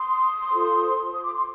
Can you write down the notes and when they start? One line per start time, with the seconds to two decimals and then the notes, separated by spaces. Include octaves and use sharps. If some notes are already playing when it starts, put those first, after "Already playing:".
Already playing: C6 D#6
0.51 F4 A4 C5
1.13 D#6
1.23 D6
1.35 C6